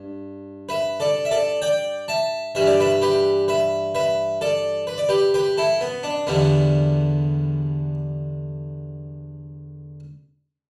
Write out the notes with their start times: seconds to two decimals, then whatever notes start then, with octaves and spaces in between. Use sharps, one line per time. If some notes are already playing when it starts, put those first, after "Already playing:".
Already playing: G2
0.69 B4 E5
1.00 A4 D5
1.25 E5
1.31 A4 D5
1.62 D5 G5
2.08 E5 A5
2.55 G2 E3 G3 E5
2.67 D5
2.80 B4 E5
3.02 G4 B4
3.48 B4 E5
3.95 B4 E5
4.41 A4 D5
4.87 B4
4.98 D5
5.09 G4 B4
5.34 G4 B4
5.58 E4 A4
5.81 B3
6.03 D4
6.27 E2 D3 G3 B3